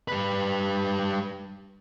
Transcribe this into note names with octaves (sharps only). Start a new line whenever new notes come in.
G3 B4